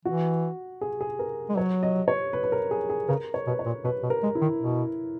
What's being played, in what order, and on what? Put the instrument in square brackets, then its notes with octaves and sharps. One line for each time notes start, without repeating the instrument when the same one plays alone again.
[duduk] E3 [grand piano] F#4
[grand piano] G#4
G#4
A#4
[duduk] G#3
[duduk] F#3 [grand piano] C#5
[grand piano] D#5
C#5
B4
B4
A#4
G#4
G#4
[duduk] C#3 [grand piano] A#4
[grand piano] C#5
[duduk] B2 [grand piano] B4
[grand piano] C#5
[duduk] A#2
[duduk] B2 [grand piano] B4
[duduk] B2
[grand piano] A#4
[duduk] G#3
[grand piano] E4
[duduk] D#3
B2